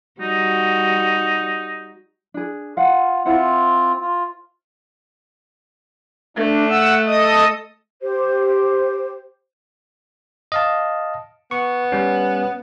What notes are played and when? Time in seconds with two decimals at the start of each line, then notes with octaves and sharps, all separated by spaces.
0.21 G3 D#4 F#4
2.34 D4 G#4
2.77 F4 F5 F#5
3.25 C4 E4 F4 C5 F#5
4.01 F4
6.37 A3 D4
6.70 F#5 E6
7.06 A4 D#5 D#6
8.03 G4 C5
10.52 D#5 F5 A5
11.51 B3 C#6
11.92 G3 C#4